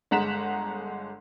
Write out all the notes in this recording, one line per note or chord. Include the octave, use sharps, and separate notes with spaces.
G1 G#3 F#5 A#5 B6 E7